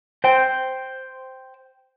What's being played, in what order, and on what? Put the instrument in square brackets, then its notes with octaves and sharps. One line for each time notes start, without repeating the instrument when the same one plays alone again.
[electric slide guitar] C5 G5